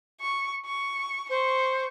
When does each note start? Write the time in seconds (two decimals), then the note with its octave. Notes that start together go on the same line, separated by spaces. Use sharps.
0.21 C#6
0.66 C#6
1.29 C5 C#6